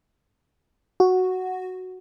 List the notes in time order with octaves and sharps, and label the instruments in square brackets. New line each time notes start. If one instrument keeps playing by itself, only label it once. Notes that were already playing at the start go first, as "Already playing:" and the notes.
[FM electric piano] F#4